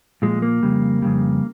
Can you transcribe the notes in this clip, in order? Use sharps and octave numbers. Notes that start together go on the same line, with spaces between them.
A#2 F3 G#3
A#3
F2 C#3 G3
F2 C#3 G3